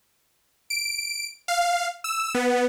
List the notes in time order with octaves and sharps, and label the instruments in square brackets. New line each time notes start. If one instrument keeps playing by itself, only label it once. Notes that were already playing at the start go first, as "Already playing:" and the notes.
[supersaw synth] D7
F5
E6
B3